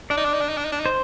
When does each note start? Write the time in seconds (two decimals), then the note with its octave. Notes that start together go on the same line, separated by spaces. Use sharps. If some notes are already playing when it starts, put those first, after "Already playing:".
0.10 D4 D5
0.17 D#4
0.25 D4
0.34 D#4
0.41 D4
0.49 D#4
0.57 D4
0.65 D#4
0.72 D4
0.80 D#4
0.86 C5